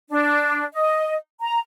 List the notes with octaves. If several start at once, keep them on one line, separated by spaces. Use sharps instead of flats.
D4
D#5
A#5